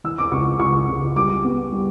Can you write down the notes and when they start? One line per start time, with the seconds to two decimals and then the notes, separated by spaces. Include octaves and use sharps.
0.04 E3 E6
0.18 D6
0.31 C#2 C#6
0.60 C#2 C#6
0.88 C#2
1.16 G3 D6
1.44 B3
1.72 G3